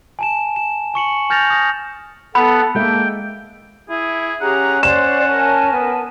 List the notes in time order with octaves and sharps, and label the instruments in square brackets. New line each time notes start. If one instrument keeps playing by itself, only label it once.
[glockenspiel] G#5 A5 E7
E7
G#5 C#6 C#7 F#7
G#5 F6 G6 A6 A#6 F7
D#6 A#6
[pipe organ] B3 F#5 [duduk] A4 [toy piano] B5
[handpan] G#3 A4 E5 [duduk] A#3 [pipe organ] G5
[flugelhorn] E4 [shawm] G#4
[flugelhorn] C#4 [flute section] G4 G#4 A#5 [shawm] F#5
[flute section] C5 D5 [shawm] F#5 [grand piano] E7
[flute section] A#4 G#5 A5
[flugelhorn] B3